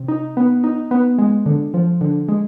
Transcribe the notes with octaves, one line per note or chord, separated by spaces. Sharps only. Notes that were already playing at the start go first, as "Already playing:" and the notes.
Already playing: C3
D#4
B3
D#4
B3
G#3
D3
F3
D3
G#3